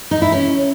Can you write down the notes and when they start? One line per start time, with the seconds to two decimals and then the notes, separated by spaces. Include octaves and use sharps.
0.11 D#4
0.22 E4
0.32 C#4